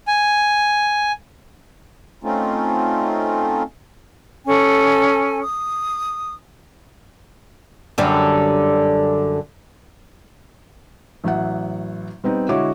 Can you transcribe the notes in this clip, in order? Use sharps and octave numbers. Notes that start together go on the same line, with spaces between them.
G#5
A3 C4 C#4 D#4 F4
C#4 A4 G#5
D#6
F#2 D3 G3
A1 F#3 E5 F#5
G3 B3 C4 D#4
D3 G#3 E4 F#4 C#5 D6